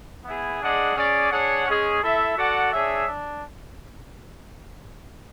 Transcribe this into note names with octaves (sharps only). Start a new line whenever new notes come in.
B3 E4 G#4
G#3 D4 G#4 D5 F#5
C#4 G#4 D5
D4 G#4 C#5 F#5
G#3 C#4 G#4
E4 A4 E5
F#4 A4 D5 F#5
D4 G#4 C#5 E5
D4